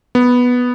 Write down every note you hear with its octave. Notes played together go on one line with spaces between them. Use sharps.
B3